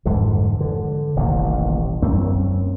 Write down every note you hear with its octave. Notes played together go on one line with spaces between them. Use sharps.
F2 G#2 D3 E3
D3
D#1 A1 C3 A#3
F#2 A#3 C4 C#4